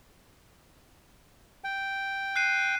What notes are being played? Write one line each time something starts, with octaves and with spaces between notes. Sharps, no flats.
G5
F#6 C7 D#7